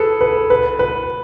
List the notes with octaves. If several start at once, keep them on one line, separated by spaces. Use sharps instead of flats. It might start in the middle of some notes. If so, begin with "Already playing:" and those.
Already playing: G#4 A4 B4
B4
B4
B4